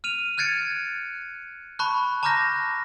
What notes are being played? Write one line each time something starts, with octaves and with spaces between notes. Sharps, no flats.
F6 D#7 F7
F6 F#6 G#6 A6 C#7 D7
A5 B5 C#6 F#6
A5 A#5 D6 F6 G6 A#6